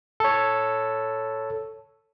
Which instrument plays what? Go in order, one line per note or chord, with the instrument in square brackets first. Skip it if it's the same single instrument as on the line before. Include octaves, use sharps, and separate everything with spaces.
[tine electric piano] A4 C#5